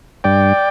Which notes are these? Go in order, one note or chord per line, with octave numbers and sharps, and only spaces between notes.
G2 D5 G5